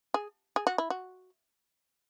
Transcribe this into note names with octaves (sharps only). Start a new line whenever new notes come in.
G#4
G#4
F#4
E4
F#4